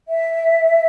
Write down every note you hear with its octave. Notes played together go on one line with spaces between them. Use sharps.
E5